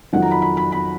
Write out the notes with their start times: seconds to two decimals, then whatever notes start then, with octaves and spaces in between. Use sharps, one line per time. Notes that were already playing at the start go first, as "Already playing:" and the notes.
0.13 F2 D#3 F#3 F#5
0.22 A#5
0.31 B5
0.42 B5
0.57 B5
0.72 B5